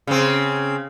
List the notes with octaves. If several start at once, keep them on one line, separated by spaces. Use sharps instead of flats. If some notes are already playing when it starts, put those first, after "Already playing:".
C#3 C4